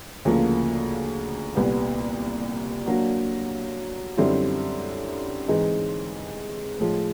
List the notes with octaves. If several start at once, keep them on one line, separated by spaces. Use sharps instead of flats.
D2 C#3 F3 A#3
C2 A#2 G3 B3
F#3 A#3 D4 F#4
F#2 D3 G3 C4 E4
G#2 E3 G#3 C4 D#4
A2 F3 G#3